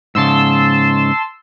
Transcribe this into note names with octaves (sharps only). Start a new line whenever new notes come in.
G#2 C#3 A5 C6 E6